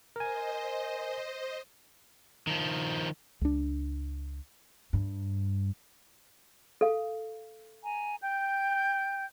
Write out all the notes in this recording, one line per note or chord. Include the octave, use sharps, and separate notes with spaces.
A#4 C5 D#5 G#5
D#3 F3
C#2 D4
G2
A4 F5
G#5 A#5
G5 G6